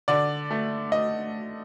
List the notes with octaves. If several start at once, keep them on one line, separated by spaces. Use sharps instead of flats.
D3 D5
A3
D#5